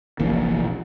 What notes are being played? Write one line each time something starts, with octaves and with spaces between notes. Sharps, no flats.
F1 A#1 A#2 E3